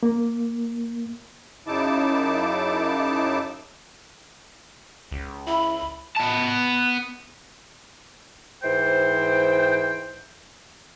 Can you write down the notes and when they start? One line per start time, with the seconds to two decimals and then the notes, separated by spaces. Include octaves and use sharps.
0.03 A#3
1.67 F#2 C#3 D#4 E4 A5 D6
5.11 C#2
5.47 E4 B5
6.17 B3 A5
8.63 G#2 E3 C5 G5